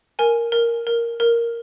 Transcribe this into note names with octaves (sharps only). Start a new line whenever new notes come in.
A#4 G#5
A#4
A#4
A#4